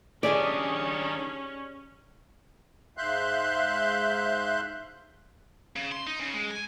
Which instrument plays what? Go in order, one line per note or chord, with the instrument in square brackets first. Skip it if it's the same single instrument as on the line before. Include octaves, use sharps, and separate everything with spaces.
[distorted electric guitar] D#3 D4 [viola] C#4 [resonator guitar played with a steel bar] G4 G#4 D#5 [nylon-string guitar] D5
[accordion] G#2 E5 F5 C6 F#6 G6
[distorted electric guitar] C#3
C6
D#4
C#3
G#3
G#5